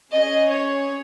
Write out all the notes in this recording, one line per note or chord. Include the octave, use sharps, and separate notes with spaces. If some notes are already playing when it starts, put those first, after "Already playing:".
C#4 G#4 D#5
C#5